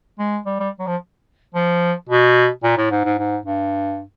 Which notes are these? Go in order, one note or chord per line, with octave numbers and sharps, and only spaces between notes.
G#3
G3
G3
F#3
F3
F3
B2
A#2
A2
G#2
G#2
G#2
G2